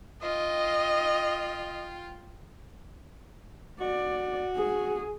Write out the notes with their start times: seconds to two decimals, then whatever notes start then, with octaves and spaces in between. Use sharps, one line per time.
0.22 F4 D#5 G5
3.81 F#4 D5
4.56 G#4